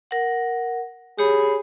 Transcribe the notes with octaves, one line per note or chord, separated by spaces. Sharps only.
A#4 F#5
G4 G#4 C#5 B5